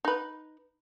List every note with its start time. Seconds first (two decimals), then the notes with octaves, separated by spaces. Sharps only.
0.05 D#4 B4